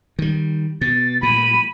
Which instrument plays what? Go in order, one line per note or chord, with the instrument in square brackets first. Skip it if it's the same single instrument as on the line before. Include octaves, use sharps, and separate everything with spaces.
[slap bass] D#3 G3
[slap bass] B2 [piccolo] A6
[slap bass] A#2 [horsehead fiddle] B5 [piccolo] D#7